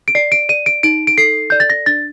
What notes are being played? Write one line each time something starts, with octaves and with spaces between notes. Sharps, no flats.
D7
D5 C7
D7
D5 D#7
D7
D#4 D7
D7
A4 C7
D5 G6
A6
A#6
D4 A6